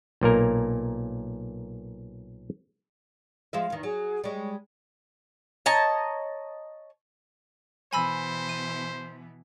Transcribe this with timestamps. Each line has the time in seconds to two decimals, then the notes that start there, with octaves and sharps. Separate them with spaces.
0.21 B1 A#2 A#3 A#4
3.53 F3 G#3 E5 F5
3.70 E2 D#3
3.83 F#3 G#4
4.24 G3 G#3 C#5
5.66 C#5 D#5 A5 A#5
7.93 B2 E3 C5 G#5 B5 E6
8.49 D#7